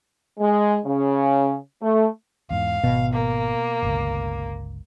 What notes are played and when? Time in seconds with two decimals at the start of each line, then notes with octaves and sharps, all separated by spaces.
0.39 G#3
0.86 C#3
1.82 A3
2.51 E2 G#2 F5
2.84 G#1 B2
3.13 A#3
3.82 G1 C#2